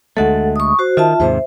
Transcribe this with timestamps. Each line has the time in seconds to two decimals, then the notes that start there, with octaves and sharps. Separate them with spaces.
0.17 D2 G#3 A3 A4 F#5
0.56 C#6 D#6
0.79 F#4 C5
0.97 D#3 F4 E5 A5
1.20 D#2 G#2 C3 C5 E5